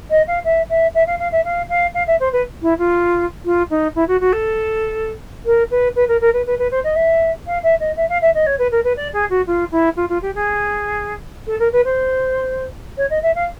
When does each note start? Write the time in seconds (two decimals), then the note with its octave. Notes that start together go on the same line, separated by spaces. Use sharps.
0.10 D#5
0.27 F5
0.44 E5
0.69 E5
0.94 E5
1.07 F5
1.19 F5
1.32 E5
1.44 F5
1.69 F5
1.94 F5
2.07 E5
2.20 C5
2.32 B4
2.62 E4
2.78 F4
3.45 F4
3.70 D#4
3.95 E4
4.08 F#4
4.20 F#4
4.32 A4
5.45 A#4
5.70 B4
5.95 B4
6.08 A#4
6.21 A#4
6.33 B4
6.46 B4
6.58 B4
6.71 C5
6.84 D#5
6.95 E5
7.46 F5
7.63 E5
7.80 D#5
7.96 E5
8.09 F5
8.21 E5
8.34 D#5
8.46 C#5
8.58 B4
8.71 A#4
8.84 B4
8.96 D5
9.13 G#4
9.30 F#4
9.47 F4
9.71 E4
9.96 F4
10.09 F4
10.22 G4
10.35 G#4
11.47 A4
11.59 A#4
11.72 B4
11.84 C5
12.97 C#5
13.10 D#5
13.22 E5
13.35 F5